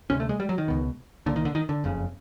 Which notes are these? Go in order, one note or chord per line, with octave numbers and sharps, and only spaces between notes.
D2 C3 C#4
A3
G#3
G3
F#3
D#3
C#2 B2
C2 A#2 D3
D#3
D3
D#3
D3
F#1 F2 C#3